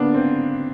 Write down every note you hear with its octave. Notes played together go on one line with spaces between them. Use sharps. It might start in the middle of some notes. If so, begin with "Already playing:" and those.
Already playing: A#3 B3 D4
C4